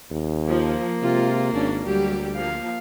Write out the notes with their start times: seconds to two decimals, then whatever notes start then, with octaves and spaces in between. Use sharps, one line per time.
0.11 D#2
0.48 F3 A#3
1.03 C3 G#3 F4
1.53 G#1 C#4 D4
1.86 D2 F#3 G3 G4
2.36 F3 A#3 F5